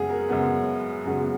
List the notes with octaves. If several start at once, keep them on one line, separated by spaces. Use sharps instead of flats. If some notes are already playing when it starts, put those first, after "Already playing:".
Already playing: F#2 C#3 G#3 B3 G#4 F#5
A#4
F#2 C#3 G#3 B3
F#2 C#3 G#3 B3 F#4